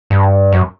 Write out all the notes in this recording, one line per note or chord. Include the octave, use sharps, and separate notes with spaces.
G2
F#2